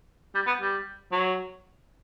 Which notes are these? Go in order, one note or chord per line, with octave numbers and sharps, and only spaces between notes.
G3
B3
G3
F#3